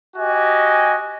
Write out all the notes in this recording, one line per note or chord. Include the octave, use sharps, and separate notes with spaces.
F#4 G4 D#5 G#5